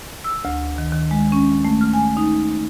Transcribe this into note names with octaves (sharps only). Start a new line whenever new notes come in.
E6
D2
D#3
D#3
G#3
C#4
A3
F6
G#5
D#4